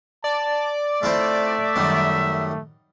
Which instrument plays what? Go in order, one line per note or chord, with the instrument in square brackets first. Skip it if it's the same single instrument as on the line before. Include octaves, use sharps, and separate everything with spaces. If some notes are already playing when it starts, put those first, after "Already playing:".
[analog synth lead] D5 [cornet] A5
[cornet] A3 [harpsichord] C4 E4 F4 [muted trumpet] E5
[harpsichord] F#2 D#3 G3